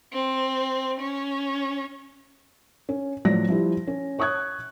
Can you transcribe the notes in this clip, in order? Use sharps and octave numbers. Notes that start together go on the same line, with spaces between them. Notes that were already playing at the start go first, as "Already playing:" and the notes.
C4
C#4
C#4
A2 F3 F#3 D5 A#6
F3 G3 E4
C#4
C#5 C#6 D#6 F#6 G#6